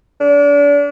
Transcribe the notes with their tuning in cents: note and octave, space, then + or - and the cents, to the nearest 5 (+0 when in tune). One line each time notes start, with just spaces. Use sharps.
D4 -35